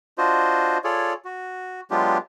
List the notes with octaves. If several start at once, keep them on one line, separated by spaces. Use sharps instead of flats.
D4 F4 F#4 C5 D#5
F4 G#4 A4 C#5 D5
F#4
F#3 G#3 B3 D4 F4 G4